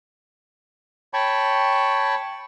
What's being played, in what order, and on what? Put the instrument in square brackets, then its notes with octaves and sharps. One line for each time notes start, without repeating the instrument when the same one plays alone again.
[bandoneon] C#5 G5 A5 B5 C#6